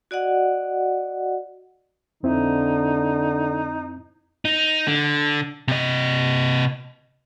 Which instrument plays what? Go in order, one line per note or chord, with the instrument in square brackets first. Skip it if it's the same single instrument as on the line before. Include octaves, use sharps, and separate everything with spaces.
[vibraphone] F#4 D5 D#5 F#5
[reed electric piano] F2 C4 E4 [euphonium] D3 [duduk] D#4
[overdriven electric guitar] D#4
D3
C3 D#5